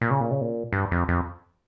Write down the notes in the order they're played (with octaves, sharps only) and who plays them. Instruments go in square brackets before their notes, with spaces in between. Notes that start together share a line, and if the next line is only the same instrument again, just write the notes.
[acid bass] A#2
C#3
A#2
C#3
A#2
G2
F2
F2